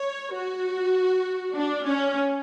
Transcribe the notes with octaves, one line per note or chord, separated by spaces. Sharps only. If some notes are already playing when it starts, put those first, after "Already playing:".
Already playing: C#5
F#4
D4
C#4